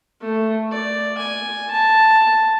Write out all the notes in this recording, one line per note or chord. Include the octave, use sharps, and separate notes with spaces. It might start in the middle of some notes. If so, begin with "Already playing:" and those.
A3
D5
G#5
A5